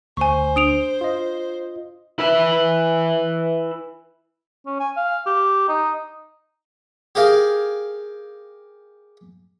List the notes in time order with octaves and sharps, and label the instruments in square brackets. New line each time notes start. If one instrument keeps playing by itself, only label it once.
[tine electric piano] D2 [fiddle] C5 [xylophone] G#5 C#6
[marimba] D4 [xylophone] D#6 D7 F7
[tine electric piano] F4 D#5
[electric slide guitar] E4 B4 E5
[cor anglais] C#4
G#5
F5
G4
D#4
[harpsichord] G4 G#4 A#4 F5